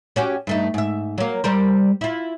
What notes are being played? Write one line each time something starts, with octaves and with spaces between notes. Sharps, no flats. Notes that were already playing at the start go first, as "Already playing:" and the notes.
C#4 F#4 G4
G2 A3 D#4
G#2 E5
F#3 A#3
G3 A#4 C5
E4 F4